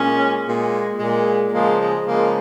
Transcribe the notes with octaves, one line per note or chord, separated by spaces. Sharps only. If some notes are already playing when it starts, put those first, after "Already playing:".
Already playing: A#2 G#3 C#4
A#2 G#3
A#2 G#3
C#3 F3 G#3 A#3
G#3
C#3 F3 G#3 A#3